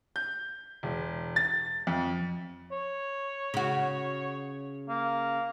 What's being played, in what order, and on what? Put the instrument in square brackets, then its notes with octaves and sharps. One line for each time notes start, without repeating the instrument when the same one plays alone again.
[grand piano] G6
E1
A6
F2
[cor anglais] C#5
[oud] C#3 F#4
[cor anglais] A#3